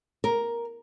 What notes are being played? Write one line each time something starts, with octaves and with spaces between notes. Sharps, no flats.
A#4